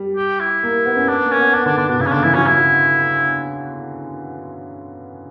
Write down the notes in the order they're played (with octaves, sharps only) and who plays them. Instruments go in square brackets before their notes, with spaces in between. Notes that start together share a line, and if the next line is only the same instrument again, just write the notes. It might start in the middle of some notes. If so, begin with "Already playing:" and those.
Already playing: [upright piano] G3
[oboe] G4
E4
[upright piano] A#3
B3
C#4
[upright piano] B3 [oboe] D4
[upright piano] A#3
[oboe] C#4
[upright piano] B3
[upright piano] B3 [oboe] D4
[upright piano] D3 [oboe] D4
[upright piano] D3 [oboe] D4
[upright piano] B2 [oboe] D4
[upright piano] C#3 [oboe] E4
[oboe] C#4
[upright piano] D3 [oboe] D4
[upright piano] E3 [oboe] E4
[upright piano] F#3 [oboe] C#4
[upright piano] F#3 [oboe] E4